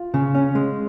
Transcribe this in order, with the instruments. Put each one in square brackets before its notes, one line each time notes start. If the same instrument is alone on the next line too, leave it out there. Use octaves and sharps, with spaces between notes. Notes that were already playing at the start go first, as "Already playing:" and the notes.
Already playing: [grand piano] F4
[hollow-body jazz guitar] C#3
C#4
G#3